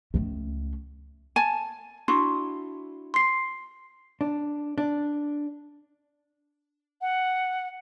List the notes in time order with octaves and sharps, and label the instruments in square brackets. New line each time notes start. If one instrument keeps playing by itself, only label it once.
[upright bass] C#2 A3
[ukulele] G#5 A5
[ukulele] D4 E4 F#4 [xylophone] C6
[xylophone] C6 C7
[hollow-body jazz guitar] D4
D4
[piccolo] F#5